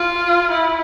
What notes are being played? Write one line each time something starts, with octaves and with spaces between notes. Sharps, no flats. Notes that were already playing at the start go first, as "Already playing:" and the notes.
Already playing: F4
E4